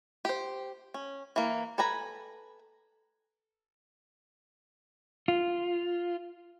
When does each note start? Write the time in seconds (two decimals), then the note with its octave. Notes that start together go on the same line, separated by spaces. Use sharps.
0.25 G4 C5
0.94 C#4
1.36 E3 A#3
1.78 A4 B4 G#5 A#5 B5
5.28 F4